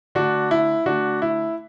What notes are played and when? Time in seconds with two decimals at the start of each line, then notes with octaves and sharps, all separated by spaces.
0.15 D3 A3 D4 F#4
0.51 E4
0.86 D3 A3 D4 F#4
1.22 E4